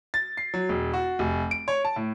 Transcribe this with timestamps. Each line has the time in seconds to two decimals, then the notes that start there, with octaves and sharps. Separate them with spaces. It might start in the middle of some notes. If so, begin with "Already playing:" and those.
0.14 A6
0.37 C7
0.54 F#3
0.69 E1
0.94 F#4
1.19 F1
1.51 D7
1.68 C#5
1.85 A5
1.96 A2